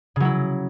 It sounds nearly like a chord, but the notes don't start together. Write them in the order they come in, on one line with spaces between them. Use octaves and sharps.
C#3 F#3 E4